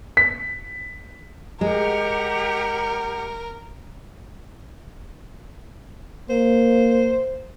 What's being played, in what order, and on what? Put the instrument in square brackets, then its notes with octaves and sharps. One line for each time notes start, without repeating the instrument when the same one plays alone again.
[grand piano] B6
[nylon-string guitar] G#3 [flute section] G4 F#5 [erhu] A#4
[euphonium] A#3 [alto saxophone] C5